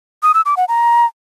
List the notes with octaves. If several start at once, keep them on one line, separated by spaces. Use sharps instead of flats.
D#6
E6
D6
F#5
A#5